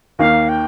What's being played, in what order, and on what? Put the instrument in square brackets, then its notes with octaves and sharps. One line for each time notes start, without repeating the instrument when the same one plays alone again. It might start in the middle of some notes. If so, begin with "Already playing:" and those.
[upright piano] D#2 D#3 A#3 [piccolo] F5
[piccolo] G5